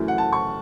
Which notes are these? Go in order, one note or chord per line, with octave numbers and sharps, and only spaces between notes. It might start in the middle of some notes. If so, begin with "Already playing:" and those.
Already playing: F#2 E3 A3
F#5
A5
C#6